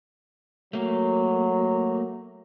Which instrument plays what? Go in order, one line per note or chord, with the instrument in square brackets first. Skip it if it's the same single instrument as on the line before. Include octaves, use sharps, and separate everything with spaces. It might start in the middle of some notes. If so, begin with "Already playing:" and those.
[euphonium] F#3 [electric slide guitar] A3 A#3